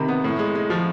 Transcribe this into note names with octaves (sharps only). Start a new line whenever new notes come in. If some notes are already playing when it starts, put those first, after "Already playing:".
Already playing: C3 D#3 B5
B3
A2
G#3
G#3
F3